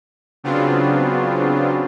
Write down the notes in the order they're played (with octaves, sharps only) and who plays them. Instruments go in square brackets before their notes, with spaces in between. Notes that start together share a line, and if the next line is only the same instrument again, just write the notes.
[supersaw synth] C#3 F#3 B3 C4 D4 F4